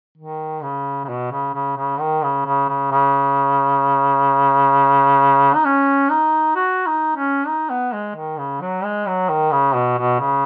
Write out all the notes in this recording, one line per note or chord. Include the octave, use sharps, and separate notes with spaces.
D#3
C#3
C#3
B2
C#3
C#3
C#3
D#3
C#3
C#3
C#3
C#3
D#4
C#4
D#4
F#4
D#4
C#4
D#4
B3
G#3
D#3
C#3
F#3
G#3
F#3
D#3
C#3
B2
B2
C#3